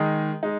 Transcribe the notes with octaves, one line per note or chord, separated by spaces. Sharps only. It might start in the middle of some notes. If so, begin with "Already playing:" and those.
Already playing: D#3 G#3 D#4 G#4
G#3 D#4